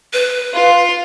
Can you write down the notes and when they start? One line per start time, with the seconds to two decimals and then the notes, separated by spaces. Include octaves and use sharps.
0.13 B4
0.54 F4